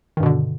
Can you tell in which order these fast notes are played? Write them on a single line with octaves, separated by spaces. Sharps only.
D#3 G2 B2 D3